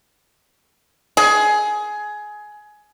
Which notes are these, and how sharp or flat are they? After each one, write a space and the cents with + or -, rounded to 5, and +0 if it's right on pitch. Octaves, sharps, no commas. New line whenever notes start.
G#4 +15